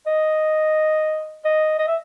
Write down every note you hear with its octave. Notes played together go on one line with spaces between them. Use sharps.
D#5
D#5
D#5
E5